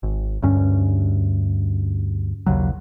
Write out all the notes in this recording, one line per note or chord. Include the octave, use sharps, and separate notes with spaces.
G#1
D2 G2 C#4
A#1 D#2 C#3 F#3